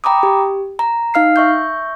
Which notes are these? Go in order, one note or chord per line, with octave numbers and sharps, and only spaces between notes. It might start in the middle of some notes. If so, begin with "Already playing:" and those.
G5 A#5 B5 D6 D#6
G4
A#5
D#4 F5 F6 C7
E5 C#6 G6